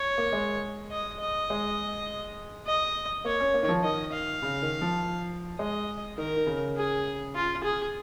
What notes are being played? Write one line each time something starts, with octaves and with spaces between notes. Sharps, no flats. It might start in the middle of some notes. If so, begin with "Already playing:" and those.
Already playing: C#5
A#3
G#3
D#5
D#5
G#3
D#5
A#3 C#5
C#4
A#3
D#3
F3
D#3 D#5
F5
C#3
D#3
F3
G#3 D#5
D#3 A#4
D#3
C#3
G#4
F4
G#4